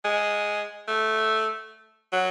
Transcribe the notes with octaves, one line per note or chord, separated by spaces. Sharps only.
G#3
A3
F#3